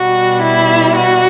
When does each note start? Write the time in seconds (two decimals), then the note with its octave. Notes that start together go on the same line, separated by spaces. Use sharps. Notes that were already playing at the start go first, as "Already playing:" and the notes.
Already playing: B2 G3 F#4
0.40 E4
0.95 F#4